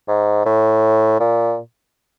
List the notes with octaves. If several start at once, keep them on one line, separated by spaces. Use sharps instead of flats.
G#2
A2
A#2